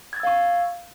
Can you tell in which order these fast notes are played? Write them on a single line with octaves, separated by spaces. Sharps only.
G#6 A6 E6 F5 C#6